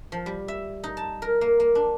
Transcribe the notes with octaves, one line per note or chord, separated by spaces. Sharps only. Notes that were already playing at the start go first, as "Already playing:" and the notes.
F3
G3
E5
D#4
A5
A#4
A#3
A#3
D4